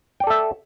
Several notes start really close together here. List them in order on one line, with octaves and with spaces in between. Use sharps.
G5 D5 A4 E5